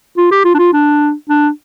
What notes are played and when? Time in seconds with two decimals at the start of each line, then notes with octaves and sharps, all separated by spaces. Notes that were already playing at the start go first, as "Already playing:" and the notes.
0.17 F4
0.31 G4
0.45 F4
0.54 D4
0.59 F4
0.73 D4
1.29 D4